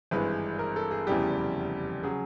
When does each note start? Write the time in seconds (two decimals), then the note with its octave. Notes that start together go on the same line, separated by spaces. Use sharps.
0.11 G#1 G2 E3 G#3 B4
0.59 A#4
0.76 A4
0.91 G#4
1.07 F1 E2 C#3 E3 G3 G4
2.03 C#3 F#3 G#4